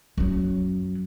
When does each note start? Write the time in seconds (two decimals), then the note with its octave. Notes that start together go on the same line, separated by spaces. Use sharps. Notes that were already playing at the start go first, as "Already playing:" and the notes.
0.18 F#2 F#3